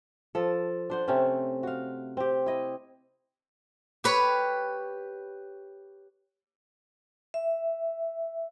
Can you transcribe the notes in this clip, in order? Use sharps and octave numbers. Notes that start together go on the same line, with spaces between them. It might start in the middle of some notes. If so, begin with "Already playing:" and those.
F3 A4
D4 C5 F#5
C3 A3 C4 C#4
F#4 F5
C4 G4
E4 D#5
G4 B4 C#5
E5